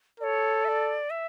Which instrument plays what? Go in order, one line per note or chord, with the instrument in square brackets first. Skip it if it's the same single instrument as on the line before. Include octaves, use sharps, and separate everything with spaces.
[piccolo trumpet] A4 [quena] D5
[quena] C#5
E5
D5
E5